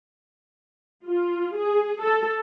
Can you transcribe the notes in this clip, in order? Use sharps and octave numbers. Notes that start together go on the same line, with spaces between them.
F4
G#4
A4